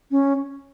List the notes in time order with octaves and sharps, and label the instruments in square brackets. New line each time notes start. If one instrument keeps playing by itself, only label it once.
[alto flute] C#4